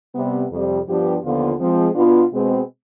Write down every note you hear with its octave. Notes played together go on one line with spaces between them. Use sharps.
C3 G3 B3
F2 C3 G3
G2 F3 B3 D4 G4
D#2 D3 F3 B3 F4
F3 G#3 C4
B2 B3 D4 F4
B2 G#3 C4